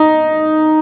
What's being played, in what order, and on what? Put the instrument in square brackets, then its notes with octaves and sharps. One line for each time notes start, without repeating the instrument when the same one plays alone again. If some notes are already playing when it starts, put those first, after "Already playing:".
Already playing: [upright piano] D#4